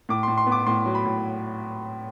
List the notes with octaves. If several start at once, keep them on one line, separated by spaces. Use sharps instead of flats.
A2 D6
A2 C6
C6
B3
D6
A2 C6
F#3
B5
A2